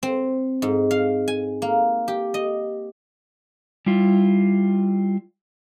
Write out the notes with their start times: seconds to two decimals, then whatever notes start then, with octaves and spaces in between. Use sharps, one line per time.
0.03 C4
0.62 G#2
0.91 F5
1.28 G#5
1.62 A#3
2.08 G4
2.34 D#5
3.86 G3 E4 F4